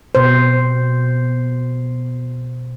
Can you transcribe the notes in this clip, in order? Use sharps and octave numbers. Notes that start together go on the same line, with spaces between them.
B2 C5